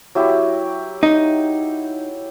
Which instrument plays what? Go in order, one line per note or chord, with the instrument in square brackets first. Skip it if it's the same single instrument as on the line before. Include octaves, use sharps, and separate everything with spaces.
[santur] F#3 E4 G4
[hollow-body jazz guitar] D#4